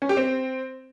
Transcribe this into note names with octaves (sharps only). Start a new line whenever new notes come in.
C#4
G4
C4